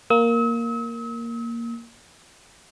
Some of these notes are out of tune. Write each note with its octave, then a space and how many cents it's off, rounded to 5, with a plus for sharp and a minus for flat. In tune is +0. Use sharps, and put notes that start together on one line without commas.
A#3 +0 E6 -45